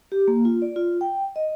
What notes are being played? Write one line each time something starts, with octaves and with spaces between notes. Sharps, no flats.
G4
A#3
F4
D5
F4
G5
D#5